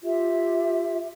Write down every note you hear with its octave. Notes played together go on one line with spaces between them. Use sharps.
F4 G4 E5